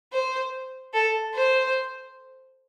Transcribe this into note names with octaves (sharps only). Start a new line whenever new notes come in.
C5
A4
C5